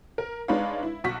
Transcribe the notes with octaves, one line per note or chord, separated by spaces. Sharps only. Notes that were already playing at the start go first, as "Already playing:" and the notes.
A#4
G#3 D4 D#4 B4 C#5 F5
E4
B1 F#4 C#6 B6